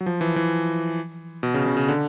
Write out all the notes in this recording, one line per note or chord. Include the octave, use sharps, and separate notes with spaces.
F#3
F3
E3
E3
B2
C#3
C#3
C#3
D3